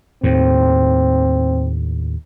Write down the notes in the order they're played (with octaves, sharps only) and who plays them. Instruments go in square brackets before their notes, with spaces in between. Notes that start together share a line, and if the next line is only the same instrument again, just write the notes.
[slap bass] D#2 A2 [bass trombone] C4